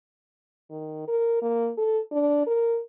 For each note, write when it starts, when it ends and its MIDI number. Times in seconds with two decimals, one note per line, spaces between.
0.70 1.07 51
1.08 1.41 70
1.42 1.71 58
1.78 2.00 69
2.12 2.44 62
2.47 2.80 70